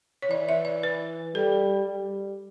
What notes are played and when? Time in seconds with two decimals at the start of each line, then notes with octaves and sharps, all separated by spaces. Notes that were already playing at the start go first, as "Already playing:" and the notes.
0.22 C#5
0.30 E3 D5
0.49 E5
0.65 D5
0.83 B4
1.35 G3 A4
1.88 G3